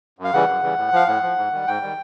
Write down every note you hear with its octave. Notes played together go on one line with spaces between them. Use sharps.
F#2
F5
C#3 E3 G3 F#5
F#2
C#3 E3 G3
A2
F3 F5
A2 F#5
F3
G#2
D#3 G3
G#2 G5
D#3 G3